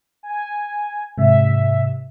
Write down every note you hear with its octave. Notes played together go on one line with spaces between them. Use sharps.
G#5
G#2 C3 E5